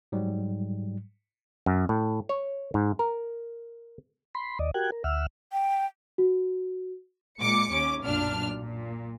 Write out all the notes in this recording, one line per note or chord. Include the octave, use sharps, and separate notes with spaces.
G#2 F#3 G3
F#2
A2
C#5
G#2
A#4
B5 C6
D#2 D5 D#5
F#4 G4 A#4 G5 F#6 G#6
A#4
D2 E5 F#5 E6 F6
G5
F#4
A#2 G#3 D6 C#7
D#2 C#4 D6
B1 F#2 A#2 D4 F6
A#2